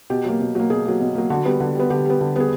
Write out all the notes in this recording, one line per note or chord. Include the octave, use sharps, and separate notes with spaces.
B2 G4
F#3 A#3
B2
F#3 A#3
B2 G#4
F#3 A#3
B2
F#3 A#3
D3 F#4
G3 B3
D3
G3 B3
D3 G4
G3 B3
D3
G3 B3 G#4